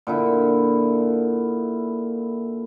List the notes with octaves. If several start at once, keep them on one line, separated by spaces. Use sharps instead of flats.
A#2 D3 E4